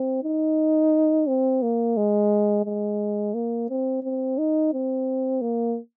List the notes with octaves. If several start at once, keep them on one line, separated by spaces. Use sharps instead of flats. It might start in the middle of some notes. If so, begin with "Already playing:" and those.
Already playing: C4
D#4
C4
A#3
G#3
G#3
A#3
C4
C4
D#4
C4
A#3